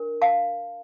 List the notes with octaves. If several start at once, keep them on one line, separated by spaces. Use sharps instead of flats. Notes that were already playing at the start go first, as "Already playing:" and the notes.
Already playing: D4 A#4
F5 A5